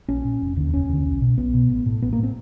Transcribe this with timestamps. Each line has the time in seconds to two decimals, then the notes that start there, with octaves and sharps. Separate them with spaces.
0.08 A#1 C#4
0.24 A#2
0.41 F1
0.57 D#2 D3
0.73 F1 C#4
0.89 D#2 D3
1.05 B1
1.21 B2
1.37 B1 B3
1.54 B2
1.70 A1
1.86 A2
2.02 A1 B3
2.13 A#3
2.18 A2
2.23 C4